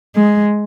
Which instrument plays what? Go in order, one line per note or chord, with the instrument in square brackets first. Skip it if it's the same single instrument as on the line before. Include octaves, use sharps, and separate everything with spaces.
[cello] G#3